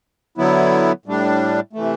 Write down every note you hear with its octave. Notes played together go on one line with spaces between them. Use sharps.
D3 F#3 B3 E4
A2 G3 D4
C3 E3 A3